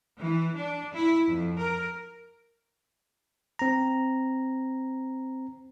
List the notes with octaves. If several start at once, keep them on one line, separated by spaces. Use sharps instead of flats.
E3
D4
E4
F2
A#4
C4 A#5